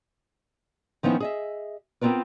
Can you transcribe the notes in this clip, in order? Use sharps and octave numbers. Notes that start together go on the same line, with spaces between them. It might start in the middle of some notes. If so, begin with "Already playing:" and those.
D#3 F3 B3 C#4 D#4 E4
G#4 D#5 E5
B3 C4 D#4 F4 A#4 B4